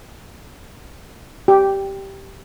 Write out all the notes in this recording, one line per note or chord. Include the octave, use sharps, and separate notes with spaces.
G4